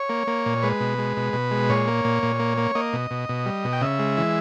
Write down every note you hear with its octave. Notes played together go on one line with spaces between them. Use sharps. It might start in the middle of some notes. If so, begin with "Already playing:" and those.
Already playing: C#5
A#3
A#3
A#2
G#3 B4
B2
G#3
B2
B2
G#3
A#2 C#5
A#3
A#2
A#2
A#3
A#3
A#3 D#5
B2
B2
B2
G3
B2
G5
C#3 E5
G#3
E3